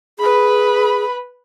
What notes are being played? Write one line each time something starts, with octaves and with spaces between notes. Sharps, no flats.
G#4 B4 B5